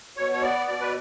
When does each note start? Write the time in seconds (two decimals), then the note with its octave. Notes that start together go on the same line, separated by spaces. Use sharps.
0.17 B2 C#5
0.32 C#5
0.42 B3 D5
0.68 B2 D5
0.81 B4